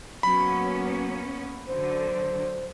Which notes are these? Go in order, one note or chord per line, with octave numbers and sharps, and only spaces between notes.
F#3 A#3 B3 C#4 B5
D3 F#3 C5